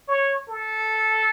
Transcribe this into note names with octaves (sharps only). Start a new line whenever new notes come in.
C#5
A4